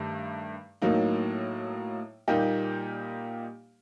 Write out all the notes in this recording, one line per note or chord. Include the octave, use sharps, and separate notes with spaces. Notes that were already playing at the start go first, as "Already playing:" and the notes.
Already playing: G2 D#3 A3
A2 F#3 A#3 D#4
A#2 G3 A#3 D#4 G4